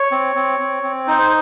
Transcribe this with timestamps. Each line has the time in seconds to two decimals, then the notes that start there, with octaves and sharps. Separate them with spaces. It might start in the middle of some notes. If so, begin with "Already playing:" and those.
Already playing: C#5
0.11 C4
0.35 C4
0.59 C4
0.83 C4
1.07 D#4 C5